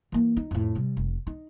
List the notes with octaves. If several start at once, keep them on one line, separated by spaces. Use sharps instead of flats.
E3 A#3
D#4
F2 A2
C3 G3
F1
D#4